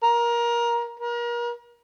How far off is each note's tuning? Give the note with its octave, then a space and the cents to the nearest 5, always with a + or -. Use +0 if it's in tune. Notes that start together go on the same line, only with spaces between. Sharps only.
A#4 +20
A#4 +35